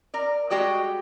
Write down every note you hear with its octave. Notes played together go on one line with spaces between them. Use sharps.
A#4 D5
G3 G#3 F#4 G4 D5 D#5